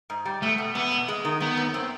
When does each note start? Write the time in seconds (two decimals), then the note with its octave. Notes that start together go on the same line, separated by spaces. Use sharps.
0.10 G#2
0.25 G3
0.42 E2 A3
0.58 B2
0.75 E2 B3
0.91 B2
1.08 G#3
1.25 D#3
1.40 D#3 B3
1.57 F#2
1.74 C4